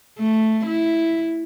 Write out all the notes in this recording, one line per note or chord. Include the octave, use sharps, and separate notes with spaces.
A3
E4